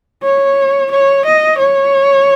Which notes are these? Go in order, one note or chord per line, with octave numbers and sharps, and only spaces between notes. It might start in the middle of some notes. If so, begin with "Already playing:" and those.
C#5
C#5
D#5
C#5